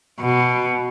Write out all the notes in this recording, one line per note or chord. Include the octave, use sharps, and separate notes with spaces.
B2